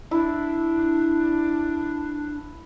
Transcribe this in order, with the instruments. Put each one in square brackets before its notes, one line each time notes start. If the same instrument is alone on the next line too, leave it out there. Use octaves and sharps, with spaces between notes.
[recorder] D4 [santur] E4